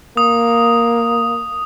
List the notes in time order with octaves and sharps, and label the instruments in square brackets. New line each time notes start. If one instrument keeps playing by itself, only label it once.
[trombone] A#3 [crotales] D#6